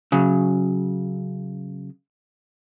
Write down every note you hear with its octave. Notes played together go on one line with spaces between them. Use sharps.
C#3 F#3